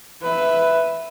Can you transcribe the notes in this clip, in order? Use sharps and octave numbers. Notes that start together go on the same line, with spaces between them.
B4 E5